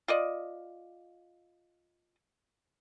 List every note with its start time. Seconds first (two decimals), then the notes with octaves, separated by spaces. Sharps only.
0.08 F4 D5 D#5